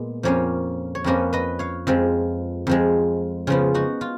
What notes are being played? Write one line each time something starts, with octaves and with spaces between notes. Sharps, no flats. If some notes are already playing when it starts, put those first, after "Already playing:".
Already playing: A#2 G#3 B3
F2 F3 A#3 C#4 C#5 F5
C#5
F2 F3 A#3 C#4 B4 D#5
B4 D#5
C#5 F5
F2 F3 G#3
F2 F3 G#3
C#3 F3 B3 F4 G#4
D#4 F#4
F4